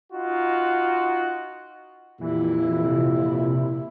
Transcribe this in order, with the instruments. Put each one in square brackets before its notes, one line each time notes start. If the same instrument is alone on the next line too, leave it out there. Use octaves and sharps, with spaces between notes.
[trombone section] D#4 F4 F#4
[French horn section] F2 A#2 G4 [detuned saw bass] E3 [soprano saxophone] E4
[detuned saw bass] C3